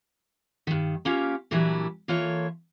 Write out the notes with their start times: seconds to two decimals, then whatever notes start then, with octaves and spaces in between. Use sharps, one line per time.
0.67 G2 D#3
1.05 A#3 C#4 F4 G4
1.51 A#2 E3 F#3 G3 D4 E4
2.08 E3 A#3 F4 A4 C#5